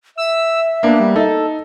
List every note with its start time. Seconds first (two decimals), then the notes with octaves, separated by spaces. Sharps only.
0.18 E5 E6
0.83 A#3 B3 D4
1.00 G3
1.16 D#4 A4